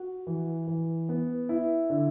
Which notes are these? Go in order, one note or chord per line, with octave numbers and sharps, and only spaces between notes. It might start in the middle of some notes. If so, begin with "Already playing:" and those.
Already playing: F#4
E3
E3
B3
E4
D3